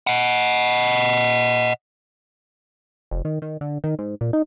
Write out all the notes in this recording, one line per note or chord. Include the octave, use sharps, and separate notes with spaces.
D#5 F#5
F1
D#3
D#3
D3
D#3
G#2
A#2
D#4